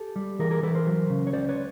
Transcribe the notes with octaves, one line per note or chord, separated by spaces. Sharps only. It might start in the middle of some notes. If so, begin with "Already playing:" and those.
Already playing: G4 A4
G3
E3 G#4 A#4
G#4 A#4
E3 A4 B4
A#4 C5
F#3
C#3
C#5
C#2 C5 D5
B4 C#5